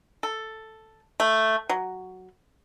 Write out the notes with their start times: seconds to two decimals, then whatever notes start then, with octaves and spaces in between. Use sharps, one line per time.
0.23 A4
1.20 A3
1.69 F#3